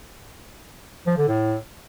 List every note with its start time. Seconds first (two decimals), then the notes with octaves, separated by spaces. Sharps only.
1.07 F3
1.17 D3
1.28 A2